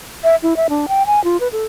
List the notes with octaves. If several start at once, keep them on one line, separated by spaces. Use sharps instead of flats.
E5
E4
E5
D4
G5
G#5
F4
B4
A4